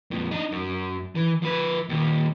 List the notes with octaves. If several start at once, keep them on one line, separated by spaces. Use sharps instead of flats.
F2 A#2
D4 D#4
F#2
E3
F3 B4
D#2 A#2